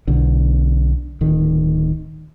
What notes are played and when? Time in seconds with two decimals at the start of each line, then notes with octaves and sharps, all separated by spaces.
0.07 B1 D3
1.21 D1 D#3